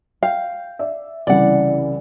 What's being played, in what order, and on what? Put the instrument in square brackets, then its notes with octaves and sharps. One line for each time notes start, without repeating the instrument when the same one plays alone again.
[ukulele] F5 [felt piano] G5
[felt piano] D5 E5
[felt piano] C2 C#3 E3 [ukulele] D5 F#5